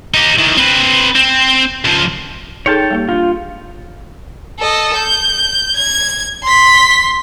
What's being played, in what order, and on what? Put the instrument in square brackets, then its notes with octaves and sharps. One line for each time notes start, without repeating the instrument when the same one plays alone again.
[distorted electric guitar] D#4 G4
D#3 E3
C4 B4
C4
C#2 F3
[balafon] D#4 G#4 A4 [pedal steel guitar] C#5 G5 A5
[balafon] G3 A#3 G4
[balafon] D4 [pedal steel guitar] F4
[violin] A4 D#5
G6
G#6
C6 B6